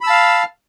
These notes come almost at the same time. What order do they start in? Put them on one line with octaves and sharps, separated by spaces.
B5 E6 A5 F5 F6